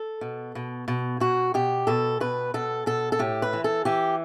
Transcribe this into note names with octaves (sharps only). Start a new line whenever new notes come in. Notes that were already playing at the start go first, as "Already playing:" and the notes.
Already playing: A4
B2
B2
B2
B2 F#4
B2 G4
B2 A4
B2 B4
B2 A4
B2 A4
A4
A2 G4
B4
E3
A4
E3 G4